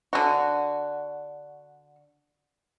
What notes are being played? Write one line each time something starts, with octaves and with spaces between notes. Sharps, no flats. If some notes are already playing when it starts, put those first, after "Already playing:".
D3 F#4